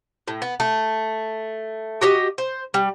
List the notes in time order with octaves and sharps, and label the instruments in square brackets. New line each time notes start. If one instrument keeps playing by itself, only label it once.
[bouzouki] A2
B3
A3
F#4 G4 D#5
C5
G3